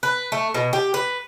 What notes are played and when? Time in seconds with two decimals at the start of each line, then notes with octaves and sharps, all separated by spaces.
0.03 B4
0.32 A3
0.54 B2
0.73 G4
0.94 B4